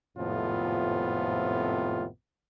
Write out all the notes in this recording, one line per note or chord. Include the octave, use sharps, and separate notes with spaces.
G#1 F2 A2 C3 B3 F4